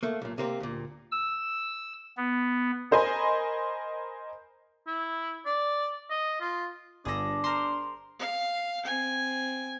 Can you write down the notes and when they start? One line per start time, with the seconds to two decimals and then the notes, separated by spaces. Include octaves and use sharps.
0.03 A3 A#3
0.22 B1 A#2
0.38 C3 A#3 C4
0.60 D2 A#2
1.12 E6
2.17 B3
2.91 A#4 C5 D#5 G#5 B5
4.87 E4
5.46 D5
6.11 D#5
6.41 F4
7.05 G1 D4 G#4 A4 D6 A#6
7.44 A#4 C5 C6
8.19 F5
8.85 C4 G#5